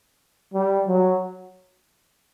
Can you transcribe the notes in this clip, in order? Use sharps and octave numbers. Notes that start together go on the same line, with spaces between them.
G3
F#3